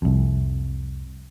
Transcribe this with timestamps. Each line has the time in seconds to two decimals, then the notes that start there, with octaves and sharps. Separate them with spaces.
0.02 C2 F2